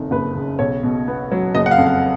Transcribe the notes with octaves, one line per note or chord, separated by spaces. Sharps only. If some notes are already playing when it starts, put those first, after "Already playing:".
Already playing: F#1 F2 D#3
F#1 B4
C#3
B1 C#5
B2
B3
F#3
F#1 D#5
F#5
F5
F2
F5